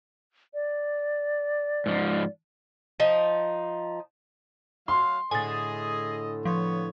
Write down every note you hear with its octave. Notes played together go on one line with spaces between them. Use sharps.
D5
G#2 F3
F3 D#4
F#3 F5 C6
A2 D3 G#4 D#5 G#5 A6
F3 B3 C#5